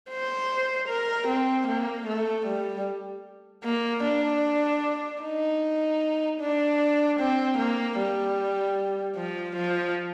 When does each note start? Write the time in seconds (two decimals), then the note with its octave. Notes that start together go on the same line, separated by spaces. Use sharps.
0.10 C5
0.89 A#4
1.28 C4
1.68 A#3
2.07 A3
2.46 G3
3.64 A#3
4.04 D4
5.23 D#4
6.40 D4
7.20 C4
7.58 A#3
7.98 G3
9.17 F3
9.56 F3